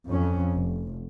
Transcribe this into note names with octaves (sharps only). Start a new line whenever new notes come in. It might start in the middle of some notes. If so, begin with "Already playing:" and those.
F2 C#4
F1